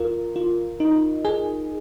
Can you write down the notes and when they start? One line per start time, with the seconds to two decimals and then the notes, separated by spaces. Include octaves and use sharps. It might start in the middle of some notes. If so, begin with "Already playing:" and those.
Already playing: D#2 F4 A#4
0.36 F4
0.80 D#4
1.25 G#4